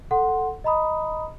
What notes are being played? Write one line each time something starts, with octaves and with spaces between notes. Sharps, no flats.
A4 F#5 C6
D#5 A#5 B5 D#6